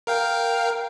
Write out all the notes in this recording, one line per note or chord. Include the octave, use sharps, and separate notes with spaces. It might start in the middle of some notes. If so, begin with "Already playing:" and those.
A#4 F5 G5